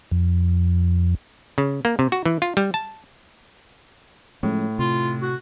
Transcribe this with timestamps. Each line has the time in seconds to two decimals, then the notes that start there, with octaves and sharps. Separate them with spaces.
0.11 F2
1.58 C#3
1.85 A#3
1.99 C3
2.12 F#4
2.26 E3
2.42 F4
2.57 G3
2.74 A5
4.43 A2 F3 G#3 C#4
4.79 C3 F4
5.22 F#4